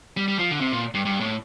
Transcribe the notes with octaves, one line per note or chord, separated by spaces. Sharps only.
G3
G3
F3
D3
C3
A#2
G2
G2
A2